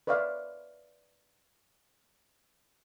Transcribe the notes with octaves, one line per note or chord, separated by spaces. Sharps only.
B4 C#5 D5 E5 F5